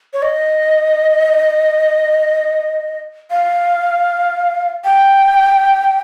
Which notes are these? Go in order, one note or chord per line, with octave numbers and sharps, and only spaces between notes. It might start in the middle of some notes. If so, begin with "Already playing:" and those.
C#5
D#5
F5
G5